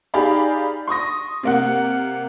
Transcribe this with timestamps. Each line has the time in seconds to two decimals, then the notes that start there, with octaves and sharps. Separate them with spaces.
0.14 D#4 G4 G#4 D5 F5 B5
0.88 C6 C#6 D#6 A#6
1.43 C3 A#3 F#5